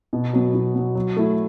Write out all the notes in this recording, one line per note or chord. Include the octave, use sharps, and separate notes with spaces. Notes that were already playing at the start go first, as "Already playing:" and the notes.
B2
F#3 B3
B2
F#3 B3
F#3
A3 E4